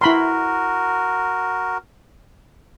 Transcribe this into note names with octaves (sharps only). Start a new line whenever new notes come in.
E4 F#4 A#4 B5 C6